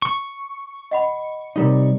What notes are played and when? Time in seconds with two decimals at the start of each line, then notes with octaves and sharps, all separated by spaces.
0.02 C#6
0.91 D#5 F#5 B5
1.56 C3 G3 D#4 A#4 C#5